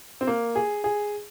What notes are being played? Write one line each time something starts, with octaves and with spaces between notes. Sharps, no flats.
C4
A#3
G#4
G#4